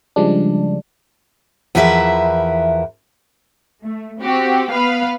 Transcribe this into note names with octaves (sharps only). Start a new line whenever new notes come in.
C#3 F3 G3 G#3 D4
E2 E3 F3 A#4 B4 E5
A3
C4 F#4 G4
B3 B4 F5